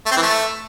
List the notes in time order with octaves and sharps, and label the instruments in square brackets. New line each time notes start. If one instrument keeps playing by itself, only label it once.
[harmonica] A3
C4
E3
A3